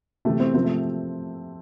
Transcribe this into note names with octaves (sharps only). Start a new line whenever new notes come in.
C3 E3 A3
C4
C3 F3 C4
A3